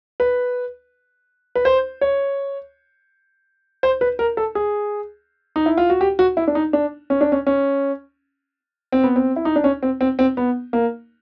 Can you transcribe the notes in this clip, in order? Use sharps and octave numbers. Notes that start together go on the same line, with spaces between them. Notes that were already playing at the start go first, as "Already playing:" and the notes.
B4
B4
C5
C#5
C5
B4
A#4
A4
G#4
D#4
E4
F4
F#4
G4
F#4
E4
D4
D#4
D4
C#4
D4
C#4
C#4
C4
B3
C4
E4
D#4
D4
C#4
C4
C4
C4
B3
A#3